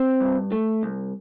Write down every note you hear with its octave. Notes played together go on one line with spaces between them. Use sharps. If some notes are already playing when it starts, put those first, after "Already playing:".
Already playing: C4
G2
A3
C2